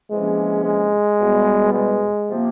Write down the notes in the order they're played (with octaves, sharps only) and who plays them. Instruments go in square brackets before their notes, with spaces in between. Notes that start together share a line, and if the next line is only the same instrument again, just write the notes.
[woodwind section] E2 C3 F3 A#3 C#4 [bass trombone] G#3
[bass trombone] G#3
[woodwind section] E2 B2 G3 B3
[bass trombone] G#3
[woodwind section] C3 F3 A#3